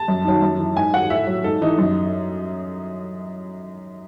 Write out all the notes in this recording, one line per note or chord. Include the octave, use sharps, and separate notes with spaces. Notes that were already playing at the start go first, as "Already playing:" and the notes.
Already playing: A5
F#2
D#3 F#3
F#2
E3
G#2 G#5
D#3 F#3 F#5
A2 E5
F#3
G#2 A4
E3 D#4
F#2